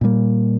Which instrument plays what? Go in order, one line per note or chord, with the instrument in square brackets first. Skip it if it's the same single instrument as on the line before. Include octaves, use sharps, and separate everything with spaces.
[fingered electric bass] A#2 G3 A#3